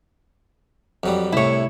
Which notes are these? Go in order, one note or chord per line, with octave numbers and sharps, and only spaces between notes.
F2 F#3 G3
C2 A2 E4 C#5